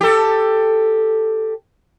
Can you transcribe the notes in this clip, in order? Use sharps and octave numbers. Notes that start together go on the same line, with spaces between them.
G4 A4